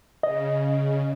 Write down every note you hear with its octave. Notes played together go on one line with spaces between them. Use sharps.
C#3 D#5